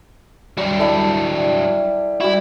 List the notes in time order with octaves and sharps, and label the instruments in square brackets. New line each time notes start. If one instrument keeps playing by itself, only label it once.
[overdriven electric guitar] F#3 D4 [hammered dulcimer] G3
[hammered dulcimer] G3 E4 A4
[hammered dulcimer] G3 F#4 [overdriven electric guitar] E4